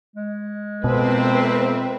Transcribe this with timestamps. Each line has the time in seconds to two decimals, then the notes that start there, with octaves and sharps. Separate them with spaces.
0.16 G#3
0.84 F2 B2 A#3 C4 A4 B4 E5